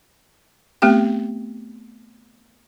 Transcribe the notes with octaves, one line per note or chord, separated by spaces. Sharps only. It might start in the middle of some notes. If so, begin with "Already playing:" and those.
A3 B3 C4 G4 G5